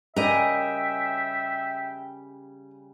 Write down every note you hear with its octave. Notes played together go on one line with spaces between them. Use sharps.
C#3 G3 A#4 D#5 E5 G5 G#5